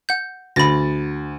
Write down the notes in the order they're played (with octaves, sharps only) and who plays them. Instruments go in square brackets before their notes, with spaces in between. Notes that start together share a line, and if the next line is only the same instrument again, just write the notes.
[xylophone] F#5 G6
[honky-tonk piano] D2 A6 [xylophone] B5 A#6